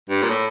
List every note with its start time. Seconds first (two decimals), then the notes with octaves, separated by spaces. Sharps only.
0.09 G2
0.23 A#2
0.29 A2